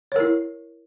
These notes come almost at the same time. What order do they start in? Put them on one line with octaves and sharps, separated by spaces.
C#5 A#4 E4